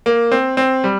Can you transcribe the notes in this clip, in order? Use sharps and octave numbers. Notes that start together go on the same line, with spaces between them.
A#3
C4
C4
G3